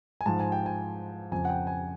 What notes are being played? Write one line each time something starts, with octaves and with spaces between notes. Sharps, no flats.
G#5
G#2 F3 A5
G#5
G5
G#5
F2 C#3 F3 G#5
F#5
G5
G#5